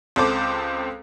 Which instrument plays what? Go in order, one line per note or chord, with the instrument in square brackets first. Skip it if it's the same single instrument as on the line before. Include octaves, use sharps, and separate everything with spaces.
[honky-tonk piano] C#2 C4 A4 C5 D6